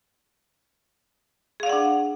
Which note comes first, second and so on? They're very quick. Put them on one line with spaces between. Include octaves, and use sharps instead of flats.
G#4 F5 D5 F#5 D4